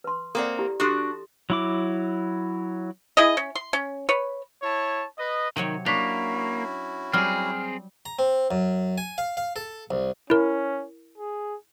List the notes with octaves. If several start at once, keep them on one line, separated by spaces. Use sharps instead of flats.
B4 C6
A#3 C4 A4 D5 F#5
E4 G4
D4 F#4 G4 A4 C6
F#3 E4 D6
E4 G#4 D#5
C#4
C6
C#4
B4 C#5
E4 C#5 A5
B4 D#5
C3 D#3 F#3 C#5
A#3 C#4 D4 E4 F#4 C#6 B6 F7
F#3 G3 C4 G#4 F6
A#5
C4
F#2
G#5
F5
F5
A4
C2
C#4 E4 A#4
G#4